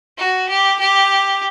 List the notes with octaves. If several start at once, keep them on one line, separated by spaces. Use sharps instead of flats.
F#4
G4
G4